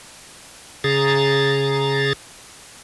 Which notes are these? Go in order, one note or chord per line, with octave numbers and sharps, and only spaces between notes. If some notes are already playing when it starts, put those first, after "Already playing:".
C#3 G#4 A#5 A6